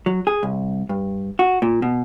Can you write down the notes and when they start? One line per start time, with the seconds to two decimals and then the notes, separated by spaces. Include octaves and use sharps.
0.06 F#3
0.27 G#4
0.43 C2
0.89 G2
1.39 F#4
1.62 A#2
1.82 B2